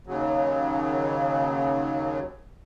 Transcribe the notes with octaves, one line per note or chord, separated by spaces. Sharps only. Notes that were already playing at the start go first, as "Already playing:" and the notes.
D#2 C#3 F#3